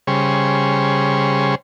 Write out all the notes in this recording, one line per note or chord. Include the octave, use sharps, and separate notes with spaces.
C#3 G3 G#4 C5 C#5